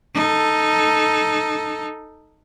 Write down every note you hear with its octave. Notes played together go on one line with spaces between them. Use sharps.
D#4 A4